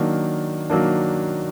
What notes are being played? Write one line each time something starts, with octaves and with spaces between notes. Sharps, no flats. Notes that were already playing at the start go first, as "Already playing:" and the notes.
Already playing: D#3 F#3 A#3 D4
D#3 F#3 A#3 D4